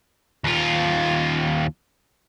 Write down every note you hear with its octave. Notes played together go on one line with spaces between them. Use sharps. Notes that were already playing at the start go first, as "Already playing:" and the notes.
D#2 F4